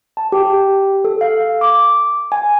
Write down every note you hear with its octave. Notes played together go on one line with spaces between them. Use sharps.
A5
G4
A4
F5
D6
G#5